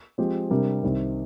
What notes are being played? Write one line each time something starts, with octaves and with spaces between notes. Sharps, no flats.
F3 G#3 C4 G4
C3 G3 D4 G4 A#4
C2 C3 D#3